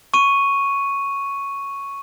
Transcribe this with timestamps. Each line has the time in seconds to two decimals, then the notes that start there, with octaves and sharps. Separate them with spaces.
0.14 C#6 D#7